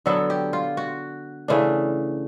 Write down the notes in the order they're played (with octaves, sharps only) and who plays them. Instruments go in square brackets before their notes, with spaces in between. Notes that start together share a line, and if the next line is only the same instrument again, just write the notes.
[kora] D3 F#3 B3 A4
G4
F4
F#4
C#3 E3 A3 D4